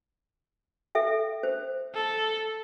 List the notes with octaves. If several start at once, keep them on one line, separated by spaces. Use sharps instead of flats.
A4 E5 G5
C5
A4